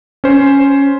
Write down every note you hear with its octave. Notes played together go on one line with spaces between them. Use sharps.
C#4 C5